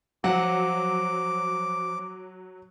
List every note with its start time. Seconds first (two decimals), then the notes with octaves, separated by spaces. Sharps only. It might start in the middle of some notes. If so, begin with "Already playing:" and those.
0.24 F3 F#3 F#5 D6